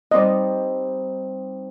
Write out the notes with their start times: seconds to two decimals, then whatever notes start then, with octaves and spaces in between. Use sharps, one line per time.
0.11 G3 C4 D#4 D5 D#5